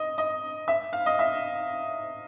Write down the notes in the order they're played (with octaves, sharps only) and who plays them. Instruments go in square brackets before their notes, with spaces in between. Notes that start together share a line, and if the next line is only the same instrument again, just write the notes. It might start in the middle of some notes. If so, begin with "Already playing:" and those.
Already playing: [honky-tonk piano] D#5
D#5
E5
F5
D#5
E5